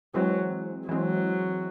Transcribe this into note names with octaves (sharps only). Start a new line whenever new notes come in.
E3 F#3 G#3 C4
E3 F#3 G#3 C4